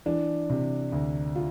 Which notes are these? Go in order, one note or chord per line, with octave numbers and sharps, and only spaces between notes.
E3 D4
C3
D2
F4